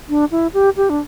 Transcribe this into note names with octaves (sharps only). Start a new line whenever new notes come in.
D4
E4
G4
G4
D4